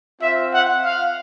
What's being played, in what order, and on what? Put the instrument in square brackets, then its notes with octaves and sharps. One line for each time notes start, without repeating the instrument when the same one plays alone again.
[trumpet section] C4 F4 E5
F#5
F5